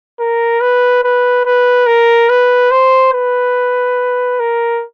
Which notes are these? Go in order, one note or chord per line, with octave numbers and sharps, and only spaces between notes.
A#4
B4
B4
B4
A#4
B4
C5
B4
A#4